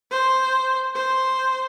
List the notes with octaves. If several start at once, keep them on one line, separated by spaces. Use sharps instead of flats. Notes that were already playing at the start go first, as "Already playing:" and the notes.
C5
C5